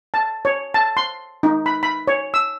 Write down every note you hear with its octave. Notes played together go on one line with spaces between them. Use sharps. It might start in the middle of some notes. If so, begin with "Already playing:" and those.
A5
C#5
A5
C6
D#4
B5
B5
C#5
E6